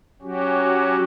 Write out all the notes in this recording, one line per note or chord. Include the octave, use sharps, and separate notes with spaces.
F#3 C#4 F#4 G4